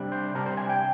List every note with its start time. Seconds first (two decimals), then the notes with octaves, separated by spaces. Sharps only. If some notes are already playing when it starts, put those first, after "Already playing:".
Already playing: C3 G3 D4
0.12 C5
0.35 C3 G3 D4 A#4
0.46 C5
0.57 G#5
0.69 G5